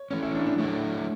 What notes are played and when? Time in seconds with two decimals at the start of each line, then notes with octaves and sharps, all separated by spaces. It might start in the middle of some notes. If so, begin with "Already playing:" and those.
Already playing: C#5
0.11 E3 A3 C#4 C#5
0.22 E4
0.35 D4
0.46 D4
0.58 F#3 A3 E4